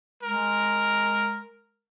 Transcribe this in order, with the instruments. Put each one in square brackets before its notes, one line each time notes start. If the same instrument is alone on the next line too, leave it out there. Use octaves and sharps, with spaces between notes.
[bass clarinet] G#3 [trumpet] A#4